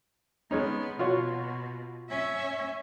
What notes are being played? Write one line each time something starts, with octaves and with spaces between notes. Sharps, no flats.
G#3 B3 C#4 D#4
B2 F4 F#4 C#5
C#4 E5